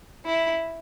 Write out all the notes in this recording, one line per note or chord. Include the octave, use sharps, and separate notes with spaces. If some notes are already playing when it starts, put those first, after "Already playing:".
E4